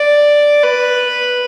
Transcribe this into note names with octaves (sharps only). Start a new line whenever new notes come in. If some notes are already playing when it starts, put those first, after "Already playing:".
Already playing: D5
B4